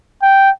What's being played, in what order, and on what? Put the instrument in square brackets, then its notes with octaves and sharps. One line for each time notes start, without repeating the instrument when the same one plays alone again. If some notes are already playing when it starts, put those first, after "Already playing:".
[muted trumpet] G5